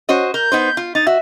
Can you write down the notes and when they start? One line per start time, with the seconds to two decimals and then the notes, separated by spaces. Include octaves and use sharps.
0.09 C#4 F#4 C5 D#5
0.34 A#4 G6
0.52 B3 D#4 C5
0.77 F4
0.95 D#4 A6
1.07 F#4 E5